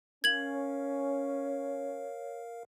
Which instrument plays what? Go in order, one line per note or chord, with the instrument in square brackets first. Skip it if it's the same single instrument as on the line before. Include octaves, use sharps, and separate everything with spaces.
[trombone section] C#4 [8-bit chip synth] A#4 F5 [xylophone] G#6 F#7
[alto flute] C#5